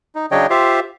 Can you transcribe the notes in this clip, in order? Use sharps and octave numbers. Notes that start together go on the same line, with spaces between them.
D#4
C#3 F#3 D4 C#5 D#5 G5
F4 G4 C5 E5 F5